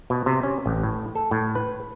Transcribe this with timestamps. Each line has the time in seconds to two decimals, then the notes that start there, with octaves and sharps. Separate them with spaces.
0.10 B2
0.26 C3
0.43 C#4
0.66 A1
0.83 A2
1.15 A4
1.31 A2
1.55 B4